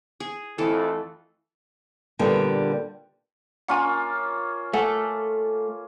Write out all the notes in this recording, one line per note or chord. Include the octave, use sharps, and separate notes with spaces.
G#4
F2 E3 A3 A4
A#2 D3 G3 A#3 B3
A#3 C#4 F4 F#5 G#5
A3 A4 F#5 G#5